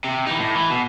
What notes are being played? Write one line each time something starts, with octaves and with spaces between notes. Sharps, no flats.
C3
E3 D#4
A2
E3
B2